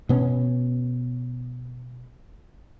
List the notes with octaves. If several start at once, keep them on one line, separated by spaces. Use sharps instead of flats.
B2 B3 C#4